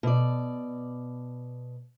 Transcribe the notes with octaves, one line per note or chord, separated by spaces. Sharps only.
B2 D5